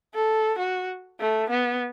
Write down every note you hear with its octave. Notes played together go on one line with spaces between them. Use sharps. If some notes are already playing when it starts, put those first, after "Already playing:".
A4
F#4
A3
B3